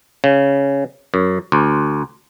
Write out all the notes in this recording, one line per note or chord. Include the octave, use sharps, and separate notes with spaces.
C#3
F#2
D2